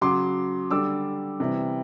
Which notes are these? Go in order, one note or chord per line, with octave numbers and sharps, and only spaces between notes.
C#3 F#3 C6 D6
D3 G3 D6 E6
C3 E3 G3